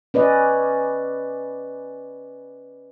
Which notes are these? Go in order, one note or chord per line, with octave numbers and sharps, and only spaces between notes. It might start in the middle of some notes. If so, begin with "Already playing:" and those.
C#4 B4 D5 D#5